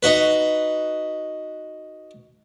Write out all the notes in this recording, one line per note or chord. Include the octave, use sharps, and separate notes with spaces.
D#4 F#4 B4